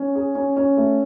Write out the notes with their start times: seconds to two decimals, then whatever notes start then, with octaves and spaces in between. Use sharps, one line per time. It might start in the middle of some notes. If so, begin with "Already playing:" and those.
Already playing: C#4
0.15 G#4
0.35 C#4
0.56 C#4
0.77 A3